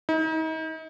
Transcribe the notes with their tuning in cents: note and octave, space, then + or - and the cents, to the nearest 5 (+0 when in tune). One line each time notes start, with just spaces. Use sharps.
D#4 +40